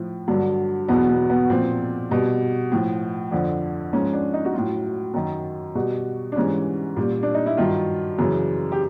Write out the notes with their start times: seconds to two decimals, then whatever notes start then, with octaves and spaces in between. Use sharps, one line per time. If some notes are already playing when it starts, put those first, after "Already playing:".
Already playing: A2 F3
0.28 G2 D3 F#3
0.88 E2 B2 F#3 B3
1.09 B3
1.30 B3
1.50 A#2 F3 C4
2.11 B2 G3
2.72 A2 F3
3.32 F2 D3 F3
3.93 G#2 F3 C#4
4.13 D4
4.33 D#4
4.45 F#4
4.54 A2 F#3 F4
5.14 F#2 D#3 F#3
5.75 B2 G3 F#4
6.32 D4
6.36 G#2 E3 G3 C#4
6.96 A#2 G3
7.23 D4
7.34 D#4
7.46 E4
7.57 G2 D#3 F#3 F4
8.19 F#2 C#3 E3
8.72 G4